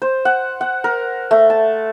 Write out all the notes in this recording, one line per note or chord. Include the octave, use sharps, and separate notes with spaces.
C5
F#5
F#5
A#4
A3
A5